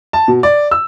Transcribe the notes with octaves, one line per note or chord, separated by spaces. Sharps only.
A5
B2
D5
E6